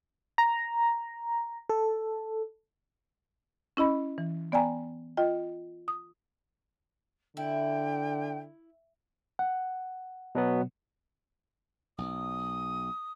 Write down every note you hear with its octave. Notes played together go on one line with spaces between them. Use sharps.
A#5
A4
C#4 E4 D#5 B5
E3
B3 D5 G5 G#5 A#5
F4 D#5 G5
D#6
D3 E4 G5
F#5
B2 F#3 B3
B1 D#6